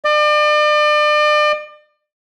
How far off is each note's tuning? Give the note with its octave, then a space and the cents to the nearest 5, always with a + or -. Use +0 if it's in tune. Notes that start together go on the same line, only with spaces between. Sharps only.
D5 +40